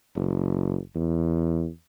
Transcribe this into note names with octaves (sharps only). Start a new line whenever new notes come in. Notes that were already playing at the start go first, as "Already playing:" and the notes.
F#1
E2